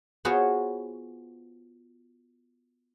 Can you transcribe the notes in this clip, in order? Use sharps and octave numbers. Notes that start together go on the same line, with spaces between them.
B3 F4 F#4 G#4 C5 C#5